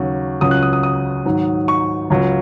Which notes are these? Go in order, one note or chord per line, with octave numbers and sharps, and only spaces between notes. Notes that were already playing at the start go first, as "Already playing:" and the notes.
Already playing: D#2 C#3 F#3
C#2 C#3 F#3 D#6
F#6
D#6
D#6
D#6
G#2 D#3 F#3
C#6
C#2 C#3 F#3